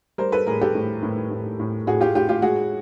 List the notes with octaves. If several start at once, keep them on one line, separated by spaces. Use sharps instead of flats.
G3 A#4 C5
A4 B4
A2 G#4 A#4
G4 A4
A2
A2
A2
A2
A2 F#4 G#4
F4 G4
A2 F4 G4
F4 G4
G#3 F#4 G#4